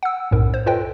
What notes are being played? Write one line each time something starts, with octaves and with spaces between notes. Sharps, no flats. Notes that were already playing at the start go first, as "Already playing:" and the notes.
F#5 E6
B1 F#2 A2 A#4
C5
F4 A4 B4 C5 D#5 G5